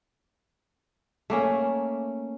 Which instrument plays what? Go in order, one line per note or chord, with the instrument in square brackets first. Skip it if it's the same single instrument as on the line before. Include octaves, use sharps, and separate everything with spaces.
[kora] A3 A#3 C#4